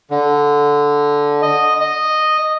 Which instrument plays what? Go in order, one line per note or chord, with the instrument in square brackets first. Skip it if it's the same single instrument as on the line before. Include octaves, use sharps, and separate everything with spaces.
[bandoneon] D3
D#5
D#5